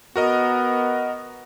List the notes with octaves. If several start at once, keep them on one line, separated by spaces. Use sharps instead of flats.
B3 F#4 A#4 D#5